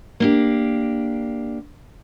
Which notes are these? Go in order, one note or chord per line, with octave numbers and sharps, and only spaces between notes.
A#3 D4 G4